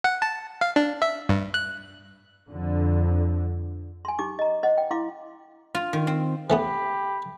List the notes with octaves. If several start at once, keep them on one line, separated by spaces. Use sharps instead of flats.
F#5
A5
F5
D4
E5
G2
F#6
F2 D3
G#5 C6
D#4 G4 D6
D#5 A#5
C5 D#5 F#5
G5
E4 F5 C6 D6
F4
D#3
C4
E3 A3 B3 G4 B5